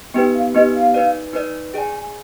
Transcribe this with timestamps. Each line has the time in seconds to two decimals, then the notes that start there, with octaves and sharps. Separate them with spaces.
0.14 B3 D#4 G4 B4 G5
0.34 F5
0.54 B3 D#4 G4 B4 D#5
0.74 F5
0.94 D#4 B4 D5
1.33 D#4 B4 D5
1.74 G#4 D5 G5 G#5
1.94 G#5